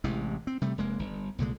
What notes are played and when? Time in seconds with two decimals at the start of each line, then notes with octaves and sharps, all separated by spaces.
0.04 A1 C3 E3 G#3
0.47 C4
0.62 C3 G3 A3
0.78 F1 G#3 A#3
0.99 G1
1.38 C2 A#2 D3 G#3